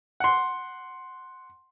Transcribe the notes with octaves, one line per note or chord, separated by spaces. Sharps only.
F#5 C6